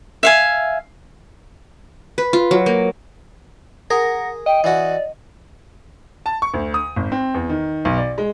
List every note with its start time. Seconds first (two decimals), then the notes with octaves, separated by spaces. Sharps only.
0.23 E5 F5 G#5
2.18 B4
2.33 F4
2.51 F#3
2.66 A#3
3.90 G#4 A#4 F#5
4.46 D#5 G5
4.64 E3 F#4 D5
6.26 A5
6.42 C#6
6.54 D2
6.74 D#6
6.96 G#1
7.12 C4
7.34 E2
7.49 D#3
7.85 B1
7.98 D5
8.18 G#3